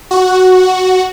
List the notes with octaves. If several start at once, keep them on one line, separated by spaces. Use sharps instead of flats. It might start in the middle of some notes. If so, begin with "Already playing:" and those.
F#4